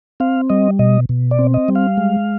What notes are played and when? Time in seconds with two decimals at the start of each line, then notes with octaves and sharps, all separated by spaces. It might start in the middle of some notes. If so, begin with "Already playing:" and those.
0.20 C4 F5
0.50 G3 D#5
0.79 B2 D#5
1.09 B2
1.31 D5
1.39 C4
1.54 D#5
1.68 G3
1.75 F5
1.97 G#3